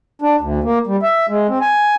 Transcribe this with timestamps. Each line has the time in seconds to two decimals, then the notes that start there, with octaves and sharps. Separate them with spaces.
0.22 D4
0.41 D2
0.64 A#3
0.87 G3
1.02 E5
1.29 G#3
1.49 C4
1.61 G#5